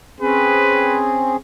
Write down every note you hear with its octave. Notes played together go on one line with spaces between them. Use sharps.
C4 C#4 G#4 B4